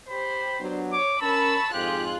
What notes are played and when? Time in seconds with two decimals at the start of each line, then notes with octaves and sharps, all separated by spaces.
0.10 G4 C5 B5
0.59 F#3 B3 D4
0.93 C#5 D6
1.22 C#4 A#4 A5 B5 C#6 E6
1.74 F2 G#2 F4 G4 G#4 F#6